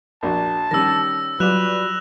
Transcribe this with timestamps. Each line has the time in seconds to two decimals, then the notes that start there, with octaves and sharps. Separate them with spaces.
0.23 A#1 D4 F#4 A5
0.71 D#3 G3 C#4 E6 A#6
1.40 F#3 G3 F4 B4 D5 F#6 E7 F7